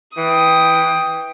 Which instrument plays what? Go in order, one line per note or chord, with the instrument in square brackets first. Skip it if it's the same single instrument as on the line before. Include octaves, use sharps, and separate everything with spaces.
[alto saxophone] E3 [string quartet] G5 D#6